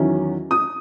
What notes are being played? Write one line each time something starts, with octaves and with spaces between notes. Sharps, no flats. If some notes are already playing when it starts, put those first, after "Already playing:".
Already playing: E2 D#3 F#3 C#4 E4
D#6